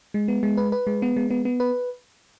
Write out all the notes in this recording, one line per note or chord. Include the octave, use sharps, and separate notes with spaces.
G#3
B3
G#3
B4
B4
G#3
B3
G#3
B3
B3
B4